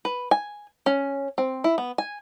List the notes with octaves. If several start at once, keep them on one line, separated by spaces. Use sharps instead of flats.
B4
G#5
C#4
C4
E4
B3
G#5